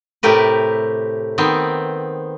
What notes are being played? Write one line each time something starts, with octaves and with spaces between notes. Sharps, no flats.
A2 C3 A3 G4 A#4 B4
D#3 B3 C4